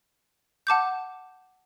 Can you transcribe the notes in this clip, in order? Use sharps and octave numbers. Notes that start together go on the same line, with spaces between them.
F#5 A5 D6 G6